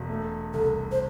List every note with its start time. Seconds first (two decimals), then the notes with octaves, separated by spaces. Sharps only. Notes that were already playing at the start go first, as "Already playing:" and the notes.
Already playing: E1
0.09 A3
0.54 C2 A4
0.92 C5